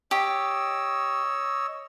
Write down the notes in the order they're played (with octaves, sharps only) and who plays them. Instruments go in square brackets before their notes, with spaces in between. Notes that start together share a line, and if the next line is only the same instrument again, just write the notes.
[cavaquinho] G4 [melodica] C#5 D#5 E6